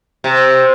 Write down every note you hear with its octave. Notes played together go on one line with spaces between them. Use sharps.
C3